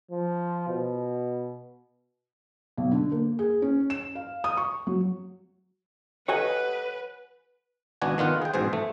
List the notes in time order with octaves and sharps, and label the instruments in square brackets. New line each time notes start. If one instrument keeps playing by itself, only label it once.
[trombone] F3
B2
[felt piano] B1
D3
A#3
G#4
C#4
E7
F5
D#6
C#6
F#3
[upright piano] G4 A4 D#5 [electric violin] B4 [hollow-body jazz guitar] C#5 F#5 G#5
[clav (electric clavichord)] G#1 B2 B3 D4 F#4 G#5
D#3 B3 F4 F#5
G#4 G5
A1 G#2 B2 G#4 C5
A3